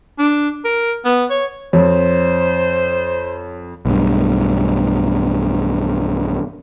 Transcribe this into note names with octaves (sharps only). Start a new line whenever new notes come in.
D4
A#4
B3
C#5
F2 C5 C#5
B1 G2